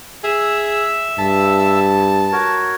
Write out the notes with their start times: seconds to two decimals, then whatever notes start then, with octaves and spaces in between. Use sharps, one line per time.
0.24 G#4 E5 E6
1.19 G2 A5
2.32 F#4 A#4 C#5